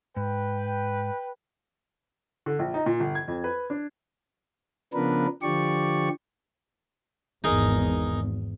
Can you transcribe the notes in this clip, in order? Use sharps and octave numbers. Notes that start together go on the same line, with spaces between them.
G#2 B4 G5
D3
A#1
D#4
A#2
G1
G#6
F2
B4
D4
C#3 F3 B3 D4 A#4 B4
D3 F3 G4 D5 C#6
G#1 E2 D#4 G#4 A#4